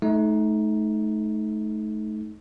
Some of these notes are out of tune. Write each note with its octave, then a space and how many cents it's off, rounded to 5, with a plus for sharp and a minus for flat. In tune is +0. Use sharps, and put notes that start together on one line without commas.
A3 -30 D#4 +10